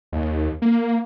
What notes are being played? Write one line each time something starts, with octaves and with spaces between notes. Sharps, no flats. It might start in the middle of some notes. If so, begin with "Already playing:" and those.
D#2
A#3